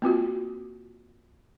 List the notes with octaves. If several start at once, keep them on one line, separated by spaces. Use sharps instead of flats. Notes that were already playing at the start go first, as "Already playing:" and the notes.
A#3 C4 F4 F#4